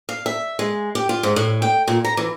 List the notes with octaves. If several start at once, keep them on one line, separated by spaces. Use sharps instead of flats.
F5
E5
G#3
G4
F4
G#2
A2
G5
A#2
A#5
E3